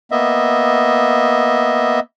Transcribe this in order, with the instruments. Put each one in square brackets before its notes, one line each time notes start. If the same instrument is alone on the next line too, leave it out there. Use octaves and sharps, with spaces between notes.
[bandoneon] A#3 B3 D#5 E5